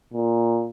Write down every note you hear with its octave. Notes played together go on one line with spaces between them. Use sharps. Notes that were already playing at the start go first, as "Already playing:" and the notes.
A#2